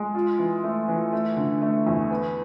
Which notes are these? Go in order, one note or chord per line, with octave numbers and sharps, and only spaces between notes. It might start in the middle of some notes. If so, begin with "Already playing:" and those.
Already playing: G#3
F4
E3
A3
E3
A3
D3
A3
E2
B3